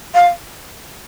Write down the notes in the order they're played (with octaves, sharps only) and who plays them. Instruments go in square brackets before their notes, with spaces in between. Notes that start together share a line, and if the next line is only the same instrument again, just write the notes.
[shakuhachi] F5